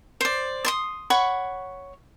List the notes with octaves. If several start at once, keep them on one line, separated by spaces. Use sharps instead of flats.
C5 D5
D5 C6 D#6
C#5 F#5 B5 C#6